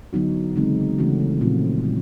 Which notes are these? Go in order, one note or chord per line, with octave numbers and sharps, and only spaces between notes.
D3 F#3 B3 D#4 F#4
C#3 E3 G#3 C4 D#4
C#3 E3 A3 C#4 F#4
A#2 F3 A3 C4 F4
A#2 G3